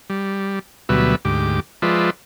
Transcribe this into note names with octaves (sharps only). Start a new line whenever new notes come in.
G3
D2 B2 F#3 G3 B4 E5
D2 G#2 G4 D6
F3 G#3 F4 B4 D5 E5